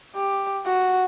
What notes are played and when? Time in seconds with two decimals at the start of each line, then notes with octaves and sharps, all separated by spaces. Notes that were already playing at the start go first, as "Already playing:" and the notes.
0.16 G4
0.66 F#4